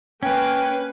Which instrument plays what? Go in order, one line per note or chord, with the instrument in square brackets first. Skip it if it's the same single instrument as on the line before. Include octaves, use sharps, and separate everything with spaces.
[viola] A#3 B4 [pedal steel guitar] C#4 [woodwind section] G5